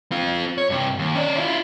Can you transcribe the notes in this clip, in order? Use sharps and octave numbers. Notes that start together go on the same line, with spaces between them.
C4 F4
C#5
G2 C3
D#2
C#4 D5
E4 F4